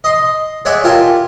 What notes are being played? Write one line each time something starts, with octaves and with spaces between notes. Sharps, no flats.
D#5 C6
G#3 C#5 D5 E5 F#5 G#5
F4 G4 A#4 E5 G#5 A5